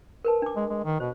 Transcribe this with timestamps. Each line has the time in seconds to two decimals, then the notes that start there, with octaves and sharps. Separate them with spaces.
0.24 A#4 B4 A5
0.42 D4 D6
0.56 G#3
0.70 G#3
0.84 D#3
1.00 B2 C5